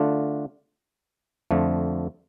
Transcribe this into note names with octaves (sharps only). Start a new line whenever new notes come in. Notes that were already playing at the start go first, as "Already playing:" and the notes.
Already playing: D3 A3 D4 F4
F2 D3 F3 A3